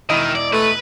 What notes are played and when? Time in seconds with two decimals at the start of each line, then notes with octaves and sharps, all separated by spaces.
0.10 E1 D#3 E4 D#5
0.35 D5
0.53 A3 B4